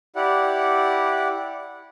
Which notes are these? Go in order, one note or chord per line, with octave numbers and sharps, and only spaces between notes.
E4 G4 D5 F#5